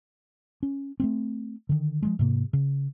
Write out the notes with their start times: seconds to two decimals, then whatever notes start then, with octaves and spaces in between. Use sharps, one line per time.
0.63 C#4
1.00 A3 A#3 C4
1.69 D3 D#3
2.03 F3 F#3 G#3
2.19 G#2 C3 A#3
2.53 C#3